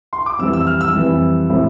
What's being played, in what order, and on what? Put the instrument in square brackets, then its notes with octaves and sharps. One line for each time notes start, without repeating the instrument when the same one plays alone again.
[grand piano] C6
D6
F2 E3 G3 E6
E6
F6
E6
F2 E3 G3
A2 G3 C4